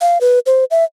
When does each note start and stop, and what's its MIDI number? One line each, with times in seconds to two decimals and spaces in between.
0.01 0.18 77
0.21 0.39 71
0.46 0.64 72
0.71 0.84 76